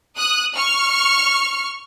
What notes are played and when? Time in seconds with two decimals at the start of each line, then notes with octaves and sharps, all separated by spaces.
0.17 D#6 F#6
0.56 C#6 F6